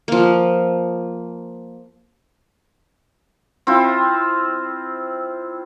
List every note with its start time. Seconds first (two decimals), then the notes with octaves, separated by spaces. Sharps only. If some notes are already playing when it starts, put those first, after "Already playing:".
0.08 F3 A#3
3.67 C4 E4 F4